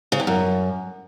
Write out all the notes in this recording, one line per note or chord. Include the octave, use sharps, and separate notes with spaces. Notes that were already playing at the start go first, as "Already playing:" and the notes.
C#3
G2
F#2